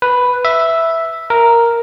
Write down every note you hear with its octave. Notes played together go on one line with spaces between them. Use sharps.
B4
E5
A#4